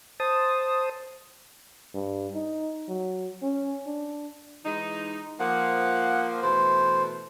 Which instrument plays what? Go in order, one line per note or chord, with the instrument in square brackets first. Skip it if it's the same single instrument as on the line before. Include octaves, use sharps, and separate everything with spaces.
[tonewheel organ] C5 A5 D#6
[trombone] G2
D#4
F#3
C#4
D4
[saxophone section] E3 G#3 D#4
[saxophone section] F3 A#3 [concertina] F#5
[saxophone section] B2 E3 A3 [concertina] C5